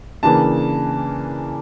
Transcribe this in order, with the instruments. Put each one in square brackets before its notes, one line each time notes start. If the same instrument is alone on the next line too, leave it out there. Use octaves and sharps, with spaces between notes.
[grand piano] C#3 E3 A#3 D4 A5